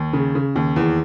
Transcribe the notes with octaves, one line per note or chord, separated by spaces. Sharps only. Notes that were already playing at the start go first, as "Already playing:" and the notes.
Already playing: D#2
C#3
C#3
D#2
E2